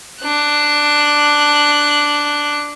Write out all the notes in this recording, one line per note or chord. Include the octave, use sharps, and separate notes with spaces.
D4 F#6